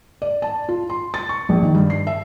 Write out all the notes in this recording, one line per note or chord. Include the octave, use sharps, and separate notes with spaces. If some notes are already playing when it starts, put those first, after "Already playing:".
D5
A5
F4
C6
A6
C#6
A#1
D#3
G2
C7
E5